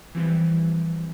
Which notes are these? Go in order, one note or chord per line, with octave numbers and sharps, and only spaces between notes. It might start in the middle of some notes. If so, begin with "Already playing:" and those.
E3 F3 G3 C4